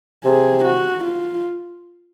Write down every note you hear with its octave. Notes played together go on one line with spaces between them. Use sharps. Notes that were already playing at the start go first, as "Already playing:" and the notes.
C3 G#4
F#4
F4